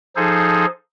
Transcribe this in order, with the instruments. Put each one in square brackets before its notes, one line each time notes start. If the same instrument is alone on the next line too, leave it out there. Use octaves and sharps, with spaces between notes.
[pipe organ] F3 D#4 G#4 A4 C5